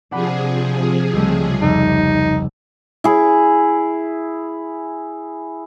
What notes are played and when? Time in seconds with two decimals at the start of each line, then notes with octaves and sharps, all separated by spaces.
0.11 C3 F3 D4 G#4 F#5 B5
1.13 C#2 G3 A3
1.62 F1 D#4
3.04 E4 G#4